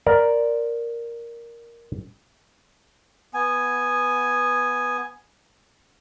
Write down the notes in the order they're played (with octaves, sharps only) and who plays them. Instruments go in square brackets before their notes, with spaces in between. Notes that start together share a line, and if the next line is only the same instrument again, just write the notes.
[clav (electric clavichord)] A#4 D5
[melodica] B3 G#5